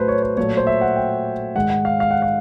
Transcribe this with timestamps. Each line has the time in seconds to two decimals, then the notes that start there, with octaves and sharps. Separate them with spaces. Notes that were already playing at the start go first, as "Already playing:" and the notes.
Already playing: A2 F#3 A3 B4 C5
0.08 C#5
0.23 C#5
0.37 A#2 F#3 A3 C#5
0.57 C5
0.67 E5
0.81 F#5
0.96 G5
1.55 G#2 D#3 G#3 F#5
1.70 F#5
1.85 F5
2.00 F5
2.11 F#5
2.22 F5